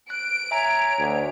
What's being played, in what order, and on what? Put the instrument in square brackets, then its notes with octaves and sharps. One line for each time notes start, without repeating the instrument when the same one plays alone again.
[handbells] F#6 [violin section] D7
[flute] C#5 [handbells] E5 G#5 A#5
[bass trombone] D2